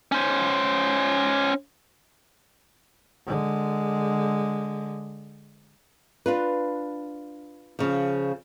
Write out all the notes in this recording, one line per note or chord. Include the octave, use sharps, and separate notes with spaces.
C#4 C5
D3 G#3
D4 F4 B4
C#3 F3